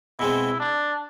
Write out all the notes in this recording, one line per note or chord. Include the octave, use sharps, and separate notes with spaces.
B2 G#3 C4 E4
D4